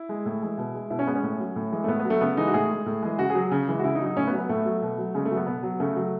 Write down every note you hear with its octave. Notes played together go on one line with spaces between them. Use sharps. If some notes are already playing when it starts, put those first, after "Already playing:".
Already playing: E4
G#3
A2
E3 G#3
B2
G#3
B2 E4
C#4
G#3 B3
C#4
A2
F#3
A2
E3 G#3
A3
A2 B3
B3
F#3
A3
C#3 B3
E3 G#3 D#4
F#4
A2 G#4
G#3
A2
E3 G#3
C#3 F#4
G#4
F#3
C#3
E3 G#3
F#4
C#3 E4
D#4
F#3
D#4
A2 C#4
B3
F#3
B3
A2 A3
F#3
B2
F#3
C#3 G#3
A3
F#3
B3
B2 B3
F#3
C#3 A3
F#3